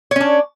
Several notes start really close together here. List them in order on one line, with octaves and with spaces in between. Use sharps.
C#5 C#4 D4